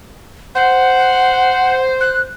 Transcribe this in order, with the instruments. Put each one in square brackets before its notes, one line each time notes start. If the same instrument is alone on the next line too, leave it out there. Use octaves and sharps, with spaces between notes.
[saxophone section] C5 [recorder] F#5
[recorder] F#6